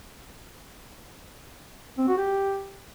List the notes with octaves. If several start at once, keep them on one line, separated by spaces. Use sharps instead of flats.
C4
F#4
G4